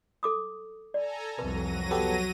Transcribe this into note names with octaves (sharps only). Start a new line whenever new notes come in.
A4 D6 D#6
A4 D5 G#5 A#5
C2 F2 F#3 B4 A#6 D#7
B3 G4 A4